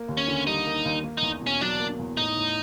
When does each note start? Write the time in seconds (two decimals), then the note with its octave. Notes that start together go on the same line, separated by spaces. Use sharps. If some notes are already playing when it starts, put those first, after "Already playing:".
Already playing: A#3
0.08 D#2
0.17 C#4
0.28 D3
0.46 G3 D#4
0.66 A#3
0.85 D#2
1.04 A#3
1.18 E2 D#4
1.41 B2
1.47 C#4
1.61 F#3 D4
1.80 A#3
1.99 E2
2.17 A2 D#4
2.37 A2